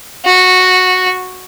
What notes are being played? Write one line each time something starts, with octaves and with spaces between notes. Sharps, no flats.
F#4